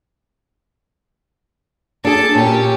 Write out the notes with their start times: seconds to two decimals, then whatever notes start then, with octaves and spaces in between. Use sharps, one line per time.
2.05 D4 G#4 A4 A5
2.35 A#2 C#4 G4